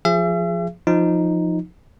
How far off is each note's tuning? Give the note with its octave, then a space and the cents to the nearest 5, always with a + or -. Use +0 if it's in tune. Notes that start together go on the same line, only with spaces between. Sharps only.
F3 +0 G#4 +0 E5 +40
F3 +0 D#4 +0